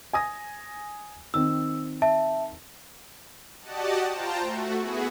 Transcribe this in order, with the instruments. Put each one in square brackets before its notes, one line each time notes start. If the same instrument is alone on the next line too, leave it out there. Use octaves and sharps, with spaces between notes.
[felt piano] G#5 D#6 A#6
[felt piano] D#3 C4 [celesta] E6
[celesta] E5 A5
[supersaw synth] F#4 G4 D5 D#5 F#5 A5
F4 C5 G5 A5 A#5
A3 F#4
B3 E4 F#4 G#4